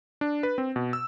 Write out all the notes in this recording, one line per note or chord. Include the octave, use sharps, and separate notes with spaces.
D4
B4
C4
B2
E6